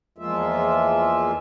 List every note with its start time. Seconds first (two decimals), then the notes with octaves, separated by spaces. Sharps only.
0.18 E2 F3 G#3 A#3 F4 E5